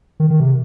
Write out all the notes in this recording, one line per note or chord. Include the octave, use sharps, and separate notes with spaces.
D#3
D#3
C3